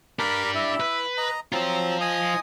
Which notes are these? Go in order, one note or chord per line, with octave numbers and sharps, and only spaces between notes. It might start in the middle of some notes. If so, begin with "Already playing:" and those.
D4 G4 A#4 B5 D6
E4 E5
B4
D#5 A#5
F#3 C4 F4 C5 A#5
D#5 G#5 D#6